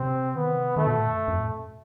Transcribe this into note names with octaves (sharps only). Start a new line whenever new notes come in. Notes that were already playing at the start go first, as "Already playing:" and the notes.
Already playing: C3 C4
D#3 B3
C3
D#3 A3
B2
A2
F#2
F#2
A2
B2